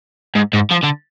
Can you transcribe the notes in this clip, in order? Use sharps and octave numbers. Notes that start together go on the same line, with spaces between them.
G#2
G#2
F3
D3